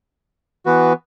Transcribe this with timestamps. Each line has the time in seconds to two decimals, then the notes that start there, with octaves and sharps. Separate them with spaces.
0.66 E3 B3 F#4 B4